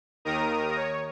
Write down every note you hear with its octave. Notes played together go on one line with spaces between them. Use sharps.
D#2 D#3 A#4 A#5 D#6
C#5